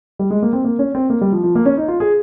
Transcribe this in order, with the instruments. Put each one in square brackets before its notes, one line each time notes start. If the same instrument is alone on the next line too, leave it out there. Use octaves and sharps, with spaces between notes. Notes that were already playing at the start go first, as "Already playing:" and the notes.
[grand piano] G3
G#3
A#3
C4
A#3
C#4
C4
A#3
G3
F3
F3
A#3
C#4
D#4
F4
G#4